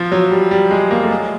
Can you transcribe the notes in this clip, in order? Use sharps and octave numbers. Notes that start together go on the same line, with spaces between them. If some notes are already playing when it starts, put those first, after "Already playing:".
Already playing: F3
F#3
G3
G3
G#3
A#3
A3
G#3